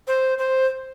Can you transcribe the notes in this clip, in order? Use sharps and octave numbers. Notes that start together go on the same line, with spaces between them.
C5
C5